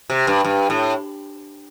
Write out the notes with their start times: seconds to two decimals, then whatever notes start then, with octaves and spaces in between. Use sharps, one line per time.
0.10 C3
0.27 G2
0.44 G2
0.70 A2